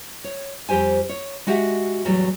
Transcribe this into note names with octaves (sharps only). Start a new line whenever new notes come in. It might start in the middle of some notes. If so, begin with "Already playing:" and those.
C#5
F2 G3 G4 C5 G#5
C#5
G#3 F#4 G4 E5 F#5
E2 A2 F#3 G3 A3